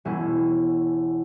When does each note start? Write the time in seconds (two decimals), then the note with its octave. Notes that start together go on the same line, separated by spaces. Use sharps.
0.05 E1 C#4 E4